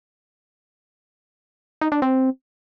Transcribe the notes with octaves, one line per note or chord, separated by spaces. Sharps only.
D#4
D4
C4